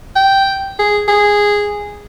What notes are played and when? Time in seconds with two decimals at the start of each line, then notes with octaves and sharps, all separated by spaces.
0.16 G5
0.79 G#4
1.08 G#4